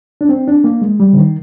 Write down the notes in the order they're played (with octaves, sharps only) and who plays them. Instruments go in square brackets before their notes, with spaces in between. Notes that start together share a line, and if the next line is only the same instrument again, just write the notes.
[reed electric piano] D4
C4
D4
A#3
G#3
G3
D3
D#3